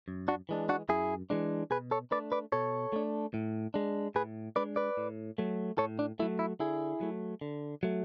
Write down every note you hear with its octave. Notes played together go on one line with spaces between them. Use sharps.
F#2
D4 F#4
E3 G#3 D4
D4 F#4
F#2 E4 G#4
E3 G#3 D4
B2 G#4 B4
A4 C#5
A3 D4 B4 D5
B4 D5
B2 A4 C#5
A3 D4
A2
G#3 D4
A2 G#4 B4
G#3 D4 B4 D5
B4 D5
A2
F#3 A3
A2 A4 C#5
D4
F#3 A3 E4
E4
D3 E4 G#4
F#3 A3
D3
F#3 A3